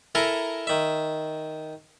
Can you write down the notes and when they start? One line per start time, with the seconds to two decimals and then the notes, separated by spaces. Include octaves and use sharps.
0.15 E4 A4 A#4 G#5 A#5
0.67 D#3 E5